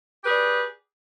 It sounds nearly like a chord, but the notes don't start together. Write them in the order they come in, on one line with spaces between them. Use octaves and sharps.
G4 B4 G#4 D5